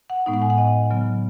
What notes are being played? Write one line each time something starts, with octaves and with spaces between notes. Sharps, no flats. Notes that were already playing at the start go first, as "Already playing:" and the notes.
F#5
A2 G#3 B3 D#4
F#5
G#5
F#5
D#5
C#3 F#3 B3